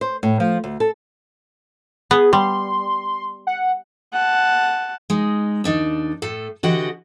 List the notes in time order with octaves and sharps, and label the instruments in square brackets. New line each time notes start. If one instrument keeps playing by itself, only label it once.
[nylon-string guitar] C5
A2
F3
D2
A4
[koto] B3 [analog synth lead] G#4
[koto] G3 [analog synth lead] C6
[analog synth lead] F#5
[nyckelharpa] F#5 A5
[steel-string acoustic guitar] G#3 D#4
D#2 D4 D#4
A2 A4
D3 E3 F#4 G4 D#5 F#5